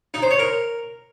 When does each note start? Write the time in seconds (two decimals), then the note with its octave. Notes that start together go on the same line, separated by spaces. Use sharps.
0.14 D#4
0.22 C5
0.31 C#5
0.39 A#4